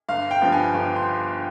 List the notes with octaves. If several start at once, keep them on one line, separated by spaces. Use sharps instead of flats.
G1 F5
G5
G2 F3 B3
G#5
G1
C6